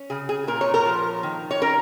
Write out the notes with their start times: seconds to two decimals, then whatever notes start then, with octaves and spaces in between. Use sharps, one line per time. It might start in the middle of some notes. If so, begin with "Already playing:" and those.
Already playing: C#4
0.10 C#3 G#4
0.29 G#4
0.48 A#2 A#4
0.61 C#5
0.74 A#4
0.85 F3
1.23 D#3
1.51 C#5
1.62 C#4 A#4